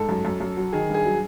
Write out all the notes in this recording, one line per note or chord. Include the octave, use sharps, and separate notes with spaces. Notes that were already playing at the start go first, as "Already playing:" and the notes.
Already playing: G#2 A4
F#2
F#2
F#2
F#3
D#3 G#4
G2
G#4
F#3